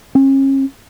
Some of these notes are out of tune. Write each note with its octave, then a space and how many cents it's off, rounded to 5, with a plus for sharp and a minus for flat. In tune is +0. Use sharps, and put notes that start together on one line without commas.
C#4 -35